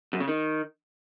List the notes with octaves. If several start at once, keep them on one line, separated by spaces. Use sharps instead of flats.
F#2
C#3
D#3